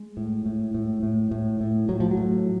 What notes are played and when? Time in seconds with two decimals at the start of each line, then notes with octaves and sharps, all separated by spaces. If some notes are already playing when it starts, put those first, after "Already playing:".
Already playing: G#3
0.17 A2
0.46 A2
0.74 A2
1.03 A2
1.31 A2
1.61 A2
1.89 A2 F#3
2.00 F3
2.11 F#3
2.17 A2